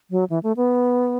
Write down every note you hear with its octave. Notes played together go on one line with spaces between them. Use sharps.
F#3
E3
A3
B3